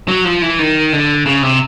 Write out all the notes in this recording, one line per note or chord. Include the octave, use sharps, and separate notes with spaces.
F#3
F3
E3
D#3
D3
C#3
C3